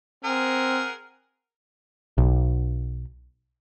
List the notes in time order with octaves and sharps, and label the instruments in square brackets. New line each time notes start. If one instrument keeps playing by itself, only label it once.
[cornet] C4 [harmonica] G#4 A#4 F#5
[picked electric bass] B1